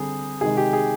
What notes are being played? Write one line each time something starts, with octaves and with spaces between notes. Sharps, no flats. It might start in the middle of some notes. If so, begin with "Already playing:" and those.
Already playing: D3 G3 C4 G#4
C3 D#3 G#3 D#4 G#4
G4
G#4